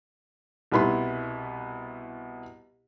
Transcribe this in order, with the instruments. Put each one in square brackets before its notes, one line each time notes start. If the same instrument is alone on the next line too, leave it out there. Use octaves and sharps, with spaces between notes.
[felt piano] C2 B2 B3 E4 C6